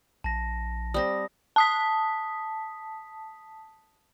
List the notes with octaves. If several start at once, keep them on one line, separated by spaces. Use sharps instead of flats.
A#1 A5 A#6
G3 C4 D#6 A#6
A5 D#6 B6